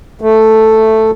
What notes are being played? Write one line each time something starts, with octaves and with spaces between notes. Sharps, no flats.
A3